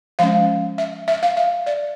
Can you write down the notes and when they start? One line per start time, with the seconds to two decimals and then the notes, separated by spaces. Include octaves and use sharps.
0.19 F3 G#3 C#4 F5
0.78 E5
1.08 E5
1.23 F5
1.37 E5
1.66 D5